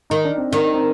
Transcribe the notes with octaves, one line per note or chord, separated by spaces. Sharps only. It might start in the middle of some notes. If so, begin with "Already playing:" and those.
D#3 D#4
D4
C4
D#3 D4
C4